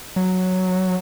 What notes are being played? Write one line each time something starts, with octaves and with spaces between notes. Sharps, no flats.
F#3